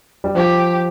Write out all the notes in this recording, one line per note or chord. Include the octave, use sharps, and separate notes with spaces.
G3
F3 G4